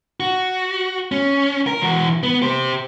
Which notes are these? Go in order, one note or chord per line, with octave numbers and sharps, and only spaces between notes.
F#4
C#4
A#4
E3 F#4
B3
G4 C5